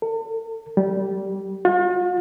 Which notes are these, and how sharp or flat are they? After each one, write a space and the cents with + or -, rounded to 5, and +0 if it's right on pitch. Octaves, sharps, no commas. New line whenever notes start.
A4 +45
G3 -15
F4 +45